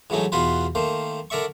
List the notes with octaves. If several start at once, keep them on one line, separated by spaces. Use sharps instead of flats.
G#2 E3 F#3 A3 D#4
E2 B2 F4 F#4 B4 C5
D#3 A3 A#3 C5
D3 A#4 D5 E5 C#6